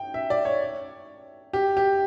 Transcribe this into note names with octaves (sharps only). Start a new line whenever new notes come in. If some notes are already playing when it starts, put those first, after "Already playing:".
Already playing: G5
E5
D5
C#5
G4
G4